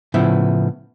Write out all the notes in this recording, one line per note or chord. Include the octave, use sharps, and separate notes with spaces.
A2 C#3 F3 B3 E4